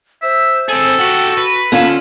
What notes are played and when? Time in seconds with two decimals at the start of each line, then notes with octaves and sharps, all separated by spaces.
0.22 C5 E5
0.69 C4 G#4 A4
0.99 F#4 G4 F#5
1.37 B4
1.72 D3 C#4 F4 A5